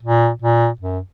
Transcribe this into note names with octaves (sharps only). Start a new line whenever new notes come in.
A#2
A#2
F#2